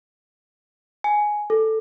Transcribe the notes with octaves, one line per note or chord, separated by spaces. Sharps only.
G#5
A4